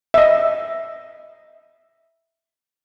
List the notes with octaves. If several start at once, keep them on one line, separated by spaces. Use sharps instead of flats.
D#5 E5